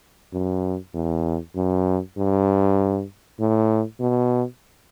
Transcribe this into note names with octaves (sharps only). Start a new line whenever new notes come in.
F#2
E2
F#2
G2
A2
B2